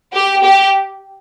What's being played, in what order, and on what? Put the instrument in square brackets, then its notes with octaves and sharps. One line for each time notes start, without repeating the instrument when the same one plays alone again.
[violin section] G4
G4